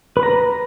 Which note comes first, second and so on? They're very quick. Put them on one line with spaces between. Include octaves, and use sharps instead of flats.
B4 B5 A#5